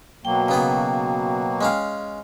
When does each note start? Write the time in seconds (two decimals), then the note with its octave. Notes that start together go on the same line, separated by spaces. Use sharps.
0.25 B2 F#3 A#3 G5
0.49 C#3 B3 G#4
1.61 G#3 C#4 F5